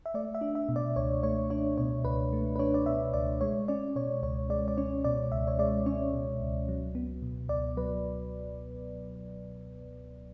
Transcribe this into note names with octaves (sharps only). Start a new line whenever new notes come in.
E5
A3 D5
E5
D4
E5
B2
D5
C#2 C#5
A3 C#5
D4 C#5
B2 C#5
C#2 B4
A3
B4
D4 C#5
D5
B2 E5
C#2 D5
G#3 C#5
C#4 D5
B2 C#5
C#2 C#5
G#3 D5
D5
C#4 C#5
B2 D5
C#2 E5
C#5
G#3 D5
C#4 C#5
B2
C#2
F#3
B3
B2
C#2 D5
F#3 B4